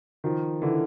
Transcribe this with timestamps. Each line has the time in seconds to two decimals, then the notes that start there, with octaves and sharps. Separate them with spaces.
0.24 D#3 F3
0.62 D3 E3